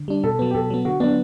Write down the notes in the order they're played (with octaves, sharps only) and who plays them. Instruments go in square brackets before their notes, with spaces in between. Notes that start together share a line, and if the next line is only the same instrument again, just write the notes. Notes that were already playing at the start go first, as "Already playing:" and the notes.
Already playing: [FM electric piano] D3
G3 D4
[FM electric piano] B2 [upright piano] A4
[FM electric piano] F#3 B3
[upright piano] G4
[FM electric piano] B2 [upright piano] A4
[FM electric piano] F#3 B3
[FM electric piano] D3 [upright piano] F#4
[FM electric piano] F#3 B3 [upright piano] D4